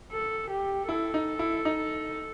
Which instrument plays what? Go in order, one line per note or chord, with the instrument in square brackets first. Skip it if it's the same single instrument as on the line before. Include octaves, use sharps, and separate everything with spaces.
[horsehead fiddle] A4
G4
[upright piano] E4 [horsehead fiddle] A4
[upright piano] D#4
E4
D#4